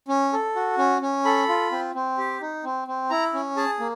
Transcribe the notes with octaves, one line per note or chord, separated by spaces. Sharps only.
C#4
A4
F#4
C#4
C#4
A4 B5
F4
C4
C4
G4
D#4
C4
C4
E4 A#5
C#4
G#4 A5
A#3